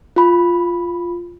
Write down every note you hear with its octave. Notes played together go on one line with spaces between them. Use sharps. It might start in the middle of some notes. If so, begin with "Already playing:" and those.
F4 B5